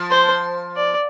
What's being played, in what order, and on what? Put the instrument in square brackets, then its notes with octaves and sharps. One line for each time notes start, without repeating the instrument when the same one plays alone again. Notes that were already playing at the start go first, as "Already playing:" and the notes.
Already playing: [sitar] F3
[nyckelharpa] C5
D5